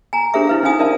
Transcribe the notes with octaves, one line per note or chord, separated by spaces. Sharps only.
G#5 A#5
D4 G4 A4 C5 E5 D6
E4 B4 F5
C#4 D#4 F4 F5 G#5 D#6
A#4 C5 D5 E5 F5 A5